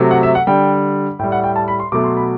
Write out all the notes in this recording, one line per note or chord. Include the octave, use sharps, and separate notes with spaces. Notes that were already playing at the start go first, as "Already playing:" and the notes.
Already playing: C3 F#3 A3
F#5
E5
F#5
D3 G3 G5
A2 G3 G5
F#5
G5
A5
B5
C6
B2 F#3 A3 D6
C6
B5